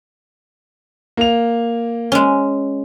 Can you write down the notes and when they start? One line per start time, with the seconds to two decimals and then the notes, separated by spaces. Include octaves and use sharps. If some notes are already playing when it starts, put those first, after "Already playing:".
1.17 A#3 F7
2.12 G#3 C#4